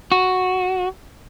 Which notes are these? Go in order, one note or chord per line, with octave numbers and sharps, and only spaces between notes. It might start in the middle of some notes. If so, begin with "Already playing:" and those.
F#4